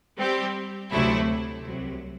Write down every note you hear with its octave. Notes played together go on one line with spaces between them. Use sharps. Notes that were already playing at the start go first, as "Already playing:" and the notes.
G3 C4 G4
D2 C3 F#3 A3 E4
C2 C3 F#3